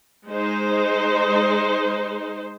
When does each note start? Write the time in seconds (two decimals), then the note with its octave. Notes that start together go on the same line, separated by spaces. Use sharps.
0.29 G#3 D#4 C5